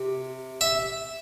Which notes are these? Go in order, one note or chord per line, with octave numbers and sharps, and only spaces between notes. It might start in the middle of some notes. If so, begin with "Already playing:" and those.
Already playing: C3
E5